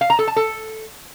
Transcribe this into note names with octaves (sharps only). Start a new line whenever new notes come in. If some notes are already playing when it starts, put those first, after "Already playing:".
F5
A#5
A4
A5
A4